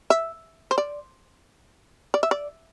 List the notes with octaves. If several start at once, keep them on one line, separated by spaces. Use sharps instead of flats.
E5
C5
D5
D5
E5
D5